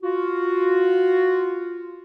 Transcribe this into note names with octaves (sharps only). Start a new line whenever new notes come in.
F4 F#4